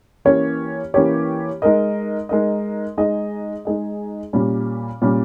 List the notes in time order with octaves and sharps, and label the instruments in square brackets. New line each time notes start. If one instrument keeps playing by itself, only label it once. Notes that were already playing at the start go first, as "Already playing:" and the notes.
[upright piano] E3 A#3 C#4 G4 C#5
E3 A#3 C#4 G4 C#5
G#3 D#4 A#4 D#5
G#3 D#4 A#4 D#5
G#3 D#4 G#4 D#5
G#3 D#4 G#4 D#5
A#2 G3 C#4
A#2 G3 C#4